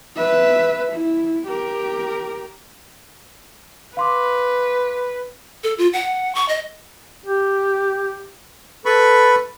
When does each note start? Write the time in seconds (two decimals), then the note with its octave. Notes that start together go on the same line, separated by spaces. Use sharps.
0.16 B4 E5
0.93 E4
1.48 G4 A#4
3.97 B4 F5 C6 D6
5.64 A4
5.78 F4
5.93 F#5
6.35 C#6
6.48 D#5
7.26 G4
8.86 A4 B4 B5 C#6